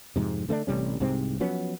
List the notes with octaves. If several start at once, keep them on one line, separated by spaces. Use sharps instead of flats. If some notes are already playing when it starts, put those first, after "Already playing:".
F2 G#2 C3
D3 A3 B3 D4
A1 C3 G3 C#4
C2 G#2 C3 C4
F3 F#3 B3 C#4